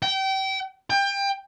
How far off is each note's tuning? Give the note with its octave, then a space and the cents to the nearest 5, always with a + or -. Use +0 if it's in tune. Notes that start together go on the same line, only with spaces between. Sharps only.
G5 -30
G5 +25